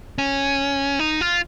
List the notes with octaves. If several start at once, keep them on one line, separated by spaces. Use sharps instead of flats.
C#4
D#4
F4